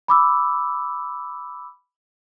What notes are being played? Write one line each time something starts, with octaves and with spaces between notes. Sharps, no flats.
B5 D6 E6